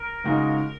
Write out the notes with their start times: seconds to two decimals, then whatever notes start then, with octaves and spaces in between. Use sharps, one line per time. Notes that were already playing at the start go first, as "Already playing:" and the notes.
Already playing: A#4
0.24 C#2 C#3 G#3 D#4 F#4